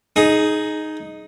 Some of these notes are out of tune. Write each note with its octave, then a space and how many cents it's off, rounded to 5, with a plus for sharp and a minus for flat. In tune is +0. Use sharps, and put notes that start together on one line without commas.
D#4 +0 G#4 +20